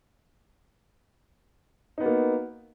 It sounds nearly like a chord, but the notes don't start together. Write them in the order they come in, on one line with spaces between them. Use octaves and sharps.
D#4 B3 F#4 A#3